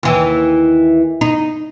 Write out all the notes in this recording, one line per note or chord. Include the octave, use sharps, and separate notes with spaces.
D#2 E3
D#4